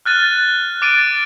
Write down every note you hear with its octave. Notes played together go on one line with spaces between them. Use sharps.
F6 F#6 A6 D#7
D6 A6 D7 D#7